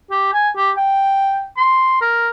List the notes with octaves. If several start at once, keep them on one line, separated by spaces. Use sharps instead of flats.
G4
G#5
G4
G5
C6
A#4